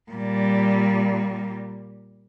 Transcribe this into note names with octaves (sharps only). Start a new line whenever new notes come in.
A#2 G3